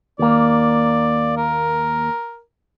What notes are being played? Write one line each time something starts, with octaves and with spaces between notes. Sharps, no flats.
D#2 A#3 D5
A#4